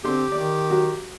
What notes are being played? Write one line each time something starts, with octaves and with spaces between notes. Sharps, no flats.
D3 C4 G4 C6
D#3 D5 D6
F#3 F#4